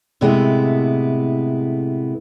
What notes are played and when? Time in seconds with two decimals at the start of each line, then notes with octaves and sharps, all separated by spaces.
0.21 A2 C3 G#3 B3 E4